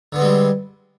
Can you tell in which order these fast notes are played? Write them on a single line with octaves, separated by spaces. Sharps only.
D3 B3 C4 G#3 G3